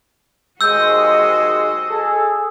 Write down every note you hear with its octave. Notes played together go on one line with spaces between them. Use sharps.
D#2 G#3 F#4 C5 D#5 E6 G6
G#4 A4